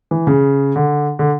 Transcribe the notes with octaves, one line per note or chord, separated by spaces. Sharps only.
E3
C#3
D3
D3